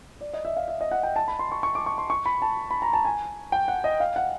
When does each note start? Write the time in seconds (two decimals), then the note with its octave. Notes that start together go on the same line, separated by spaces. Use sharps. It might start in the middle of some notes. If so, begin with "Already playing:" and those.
0.21 D5
0.33 D#5
0.45 E5
0.57 F5
0.68 E5
0.81 D#5
0.91 F#5
1.03 G5
1.16 A5
1.28 B5
1.39 C6
1.52 C#6
1.63 C#6
1.75 D6
1.86 C#6
1.98 C6
2.10 C#6
2.26 B5
2.42 A5
2.71 B5
2.82 A#5
2.93 A5
3.05 G#5
3.52 G5
3.68 F#5
3.84 D#5
4.00 F5
4.16 F#5